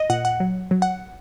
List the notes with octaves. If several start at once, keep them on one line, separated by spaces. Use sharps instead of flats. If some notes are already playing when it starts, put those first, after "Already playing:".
Already playing: D#5
A#2 F#5
F#5
F#3
F#3
F#5